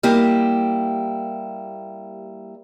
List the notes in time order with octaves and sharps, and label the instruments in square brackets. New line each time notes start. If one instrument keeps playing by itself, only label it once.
[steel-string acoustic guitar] G3 A#3 E4 G4